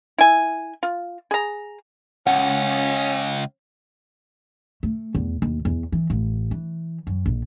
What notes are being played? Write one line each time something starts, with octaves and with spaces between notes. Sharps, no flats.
E4 G#5
F4
G#4 A#5
C#2 C#4 F#5
A3
E2
D#2
E2
E3
A1
E3
F#2
A#1